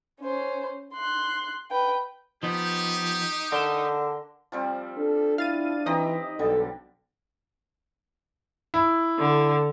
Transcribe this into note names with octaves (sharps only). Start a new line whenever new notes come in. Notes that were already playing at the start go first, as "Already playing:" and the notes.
C#4 C5
C6 F#6
B4 G5
F3 B3 D#4 G4
D3 A#4 G5 A5
F3 G3 C4
D4 A4
E4 F5 A6 D#7
E3 C4 D#4 G4 D#5 A#5
B1 D3 G3 A4
E4
D3